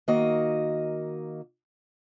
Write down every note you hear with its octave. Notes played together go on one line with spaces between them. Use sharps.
D#3 A#3 F#4 D#5